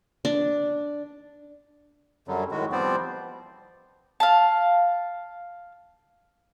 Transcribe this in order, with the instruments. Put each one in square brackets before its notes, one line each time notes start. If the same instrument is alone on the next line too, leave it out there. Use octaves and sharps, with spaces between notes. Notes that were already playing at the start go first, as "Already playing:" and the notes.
[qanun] D4
[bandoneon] F#2 D3 F#3 G3
A2 D#3 G#3 F#4
F3 G3 B3 C4 C5 D5
[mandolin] F5 A5